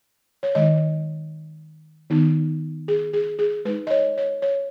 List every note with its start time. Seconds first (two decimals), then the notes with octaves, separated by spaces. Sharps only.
0.43 C#5
0.55 D#3 G#3 D#4 D#5
2.10 D#3 B3 D#4
2.88 G#4
3.13 G#4
3.39 G#4
3.65 G#3 D#4 B4
3.87 D#5
3.91 C#5
4.18 C#5
4.42 C#5